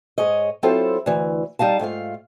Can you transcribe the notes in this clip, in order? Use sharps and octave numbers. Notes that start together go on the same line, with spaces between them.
G#2 G#4 C#5 D#5
F#3 C4 E4 F4 A4 C5
D2 E3
G3 D#4 F5 A5
G#2 A3 F4 F5